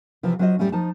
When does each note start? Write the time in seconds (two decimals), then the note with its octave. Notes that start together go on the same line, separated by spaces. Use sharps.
0.23 C3 E3 F3
0.39 F#3 C#4 F4 C5 D5 D#5
0.59 A2 G3 A3 C#4
0.72 F3 D#4 A5